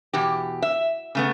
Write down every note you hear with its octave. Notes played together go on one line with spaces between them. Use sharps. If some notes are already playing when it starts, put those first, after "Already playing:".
E2 B2 G4
E5
C#3 A3 B3